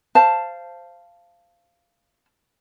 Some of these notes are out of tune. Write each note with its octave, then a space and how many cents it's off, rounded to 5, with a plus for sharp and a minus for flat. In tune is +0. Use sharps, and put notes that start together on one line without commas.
C5 +0 F5 -15 A5 +0